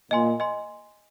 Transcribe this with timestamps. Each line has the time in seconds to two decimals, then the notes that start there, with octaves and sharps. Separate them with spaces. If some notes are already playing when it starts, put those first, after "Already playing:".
0.11 A#2 D#5 G#5 C6
0.40 D#5 G#5 C6